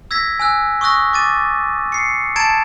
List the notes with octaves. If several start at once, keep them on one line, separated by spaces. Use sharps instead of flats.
E6 G#6 A#6 B6
G#5 E6 F#6
C#6 D#6 E6 F#6 A#6
D6 A6 D#7
C7 C#7
A5 A#5 G#6 A6 D7 E7